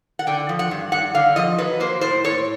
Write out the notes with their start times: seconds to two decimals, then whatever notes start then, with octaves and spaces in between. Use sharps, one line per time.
0.19 F#5
0.27 D3 G5
0.49 F3
0.59 F#5
0.71 G2
0.92 G2 F#5
1.14 D3 F5
1.36 F3 D#5
1.58 F#3 B4
1.80 A#3 C5
2.01 A2 C5
2.24 A2 C#5